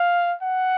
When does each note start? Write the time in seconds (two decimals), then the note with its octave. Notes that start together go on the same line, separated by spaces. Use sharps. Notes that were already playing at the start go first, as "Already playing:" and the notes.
Already playing: F5
0.42 F#5